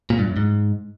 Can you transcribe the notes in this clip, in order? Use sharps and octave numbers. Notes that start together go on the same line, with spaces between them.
A#2
G2
F#2
G#2